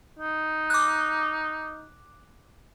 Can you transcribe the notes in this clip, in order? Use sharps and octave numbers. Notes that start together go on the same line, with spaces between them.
D#4
D6 F#6